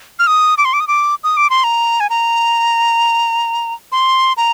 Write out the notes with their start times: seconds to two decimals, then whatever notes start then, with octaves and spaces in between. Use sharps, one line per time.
0.19 F6
0.27 D#6
0.58 D6
0.65 C6
0.73 D6
0.80 D#6
0.88 D6
1.24 D#6
1.37 D6
1.50 C6
1.64 A#5
2.00 G#5
2.10 A#5
3.92 C6
4.37 A#5